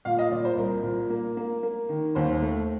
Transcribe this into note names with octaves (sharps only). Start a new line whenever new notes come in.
A#2 F5
D#5
A#2 D5
C5
C2 A#4
A#2
A#3
A#3
A#3
D#3
D#2 C5
A3